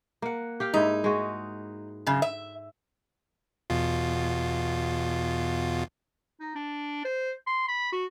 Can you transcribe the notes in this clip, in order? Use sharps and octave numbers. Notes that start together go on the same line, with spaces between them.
A#3 F#5
G4 F5 G5
G#2 D#4 E4
G#3 F#4
F#2 C#3
E5
E2 B2 F4
D#4
D4
C5
C6
B5
F#4